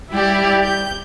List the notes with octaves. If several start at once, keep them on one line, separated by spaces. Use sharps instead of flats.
G3 E4 G4 D5
G6